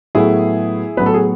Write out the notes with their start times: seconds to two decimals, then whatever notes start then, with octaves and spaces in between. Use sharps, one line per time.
0.15 A2 F#3 B3 E4 G#4
0.97 A2 F#3 B3 B4
1.06 A4
1.14 G#4